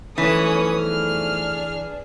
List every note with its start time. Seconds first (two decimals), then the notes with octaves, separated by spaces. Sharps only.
0.18 B1 E3 F3 A3 C#4 B4 D#6
0.80 D4 G#4 F6